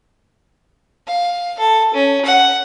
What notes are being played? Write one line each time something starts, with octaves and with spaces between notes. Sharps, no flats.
F5
A4
C#4
F#5